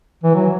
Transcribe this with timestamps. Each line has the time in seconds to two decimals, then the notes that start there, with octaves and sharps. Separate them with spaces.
0.24 E3
0.35 F#3